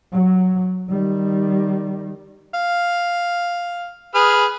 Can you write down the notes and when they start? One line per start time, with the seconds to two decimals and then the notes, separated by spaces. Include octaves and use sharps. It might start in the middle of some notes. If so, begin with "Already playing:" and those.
0.12 F#3
0.89 D#3 G3
2.54 F5
4.14 G#4 B4 F6